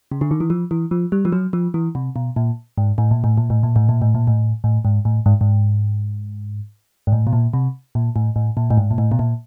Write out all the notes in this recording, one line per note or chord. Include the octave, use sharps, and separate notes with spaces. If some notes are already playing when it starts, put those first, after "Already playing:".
C#3
D3
D#3
E3
F3
E3
F3
G3
F3
F#3
F3
E3
C3
B2
A#2
G#2
A2
A#2
A2
A#2
A2
A#2
A2
A#2
A2
A#2
A2
A2
G#2
A2
G#2
G#2
G#2
A2
B2
A#2
C3
A#2
A2
A2
A#2
A2
G#2
A#2
A2
B2
A#2